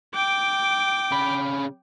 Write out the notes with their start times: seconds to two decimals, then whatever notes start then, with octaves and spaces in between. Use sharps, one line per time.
0.14 G5 D6
1.12 C#3 B5